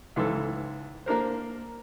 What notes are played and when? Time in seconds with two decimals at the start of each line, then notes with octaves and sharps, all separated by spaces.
0.16 C#2 G#2 E3 A4
1.06 A#3 D4 A#4 C5